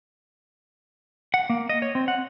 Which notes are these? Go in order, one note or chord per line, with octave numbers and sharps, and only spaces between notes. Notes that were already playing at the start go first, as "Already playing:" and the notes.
F#5
A#3
D#5
C#5
C4
F#5